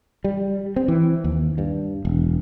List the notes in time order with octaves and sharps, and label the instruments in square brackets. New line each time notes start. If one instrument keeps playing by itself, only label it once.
[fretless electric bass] G3
C4
E3
D#2
G2
E1